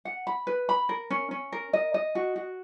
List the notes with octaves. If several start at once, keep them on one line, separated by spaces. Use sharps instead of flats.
F#5
B5
B4
B5
A#4
C#4
C#4
A#4
D#5
D#5
F#4
F#4